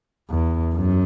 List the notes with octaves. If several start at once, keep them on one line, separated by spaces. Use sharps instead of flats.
E2
F#2